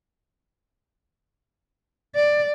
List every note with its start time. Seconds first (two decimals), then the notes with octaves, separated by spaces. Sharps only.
2.16 D5